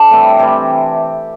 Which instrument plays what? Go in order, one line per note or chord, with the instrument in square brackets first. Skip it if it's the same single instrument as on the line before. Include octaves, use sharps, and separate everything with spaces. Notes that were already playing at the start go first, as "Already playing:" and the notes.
Already playing: [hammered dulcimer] D4 A4
A2 E3 G3 C4
A4
C3 E3 G3 G4